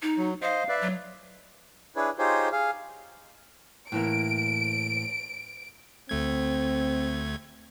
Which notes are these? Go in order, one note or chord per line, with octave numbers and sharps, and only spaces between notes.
D#4
F#3
C5 D#5 F5
B4 D5 E5
F#3
D4 E4 G#4 B4 C#5
D#4 F4 G4 G#4 C5 C#5
G#4 F5
A2 E3 A#3 D7
D2 A3 C4 G#6